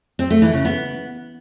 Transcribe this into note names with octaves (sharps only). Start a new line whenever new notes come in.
C4
A3
E3
C#3
B3